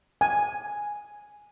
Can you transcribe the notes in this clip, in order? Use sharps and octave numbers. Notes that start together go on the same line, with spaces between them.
G#5